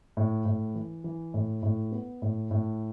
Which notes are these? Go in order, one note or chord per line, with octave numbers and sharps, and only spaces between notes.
A2
A2
E3
E3
A2
A2
B3
A2
A2